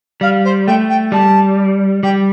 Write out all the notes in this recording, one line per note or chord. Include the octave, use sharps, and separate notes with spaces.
G3 F5
C5
A3 G5
G5
G3 A5
G3 G5